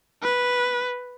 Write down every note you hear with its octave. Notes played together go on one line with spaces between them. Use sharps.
B4